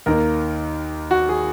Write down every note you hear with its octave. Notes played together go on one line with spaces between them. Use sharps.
D#2 D#3 A#3 A#4
F#4
G#4